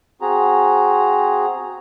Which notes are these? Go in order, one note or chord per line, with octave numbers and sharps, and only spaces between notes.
C4 F#4 G#4 A#5